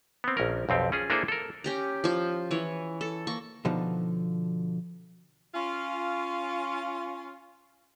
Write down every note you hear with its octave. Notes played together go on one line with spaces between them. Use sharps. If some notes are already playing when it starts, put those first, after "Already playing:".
B3 C4
A#1 C#4 A#4
B1 F2 C4 G4
C#4 F4 G#4
A#3 D4 E4 G#4 A4 C5
A4 A#4
C#4 G4 A#5
F3 F4
E3 C#5
A4
A#3 C#6
B2 D3 F3 D#4
C#4 F4